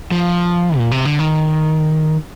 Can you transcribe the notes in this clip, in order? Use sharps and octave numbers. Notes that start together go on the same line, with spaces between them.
F3
A#2
C3
D3
D#3